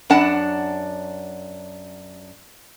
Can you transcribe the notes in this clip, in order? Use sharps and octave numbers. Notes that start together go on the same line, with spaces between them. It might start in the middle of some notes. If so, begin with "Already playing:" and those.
F#2 D4 F#5 A5